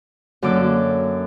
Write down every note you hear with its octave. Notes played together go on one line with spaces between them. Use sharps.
F#2 D3 A#3 D6 E6